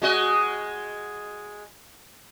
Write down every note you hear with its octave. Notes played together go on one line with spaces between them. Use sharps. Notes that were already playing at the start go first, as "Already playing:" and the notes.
G#3 F#4 D#5